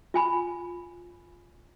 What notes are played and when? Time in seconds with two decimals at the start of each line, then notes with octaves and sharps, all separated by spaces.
0.14 F4 G#5 B5